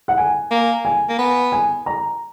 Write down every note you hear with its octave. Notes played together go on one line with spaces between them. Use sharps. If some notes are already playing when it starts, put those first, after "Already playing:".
F#5
G#5
A#3
G#5
A#3
B3
G#5
A#5